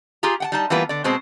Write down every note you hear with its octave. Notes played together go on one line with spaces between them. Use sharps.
F4 G4 G#4 A#5
F#5 G5 A5
G3 D#4 A5
E3 G3 A#3 B3 F4 B4
D3 D5
B2 G#3 C4 C5 A5